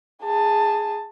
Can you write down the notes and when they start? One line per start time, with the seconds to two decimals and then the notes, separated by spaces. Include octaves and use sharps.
0.23 G#4 A5